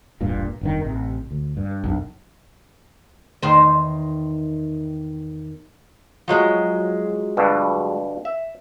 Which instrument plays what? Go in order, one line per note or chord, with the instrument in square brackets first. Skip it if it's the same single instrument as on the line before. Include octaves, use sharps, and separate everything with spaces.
[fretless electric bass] E1 A1 G2 A#2
F1 G2 D#3
A1 C3
D2
G2
B1 F#2 D4
[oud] E2 D#3 C5
F3 F#3 G#3
[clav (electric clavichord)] G2 B2 D3
E5